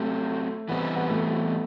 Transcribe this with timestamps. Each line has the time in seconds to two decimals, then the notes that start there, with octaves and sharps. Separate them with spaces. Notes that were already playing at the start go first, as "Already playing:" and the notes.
Already playing: F#3 A3 C4 G4
0.69 E3 G3 B3 C4
0.96 B3
1.09 A3